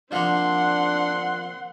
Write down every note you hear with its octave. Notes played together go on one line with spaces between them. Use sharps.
F3 A#3 C4 D4 F#5 C6